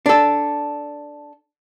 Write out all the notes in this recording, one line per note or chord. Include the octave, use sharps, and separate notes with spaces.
D4 A4